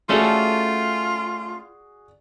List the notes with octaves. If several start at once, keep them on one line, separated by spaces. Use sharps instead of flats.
A3 C#4 F4 F#4 G#4 A4 D5